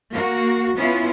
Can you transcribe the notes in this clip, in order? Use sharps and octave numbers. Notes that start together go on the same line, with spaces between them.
A#3 F#4
B3 C#4 E4 F4